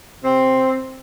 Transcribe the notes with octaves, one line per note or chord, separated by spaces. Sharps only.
C3 C4